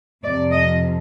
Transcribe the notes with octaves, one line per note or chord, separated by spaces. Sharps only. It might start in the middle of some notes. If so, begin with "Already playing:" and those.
F2 C3 F3 D5
D#5